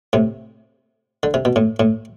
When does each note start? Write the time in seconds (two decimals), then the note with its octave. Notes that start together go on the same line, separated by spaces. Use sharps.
0.13 A2 C3
1.23 D3
1.34 C3
1.45 B2
1.56 A2
1.80 A2